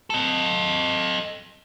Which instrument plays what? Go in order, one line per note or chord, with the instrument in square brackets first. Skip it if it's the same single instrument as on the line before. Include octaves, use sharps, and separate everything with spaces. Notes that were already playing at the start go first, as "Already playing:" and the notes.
[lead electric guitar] A4 D#5